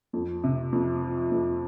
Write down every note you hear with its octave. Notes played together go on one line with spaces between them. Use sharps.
F2
C3
F2
F3
F2